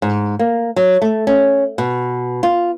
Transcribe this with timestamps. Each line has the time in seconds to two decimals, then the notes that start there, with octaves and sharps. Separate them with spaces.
0.02 G#2
0.39 A#3
0.76 F#3
1.02 A3
1.27 C#4
1.78 B2
2.43 F4